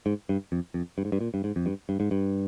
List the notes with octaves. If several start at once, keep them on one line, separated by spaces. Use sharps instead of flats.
G#2
G2
F2
F2
G2
G#2
G2
A#2
G2
G#2
F2
G2
G2
G#2
G2